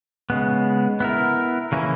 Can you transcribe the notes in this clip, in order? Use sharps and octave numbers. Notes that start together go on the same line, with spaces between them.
C#3 G#3 B3
B3 E4 A#4
C#3 E3 A#3 C#4 E4